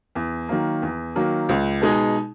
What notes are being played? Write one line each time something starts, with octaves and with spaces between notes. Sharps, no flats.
E2
D#3 F#3 A#3
E2
D#3 F#3 A#3
C#2
B2 G#3 D#4 G#4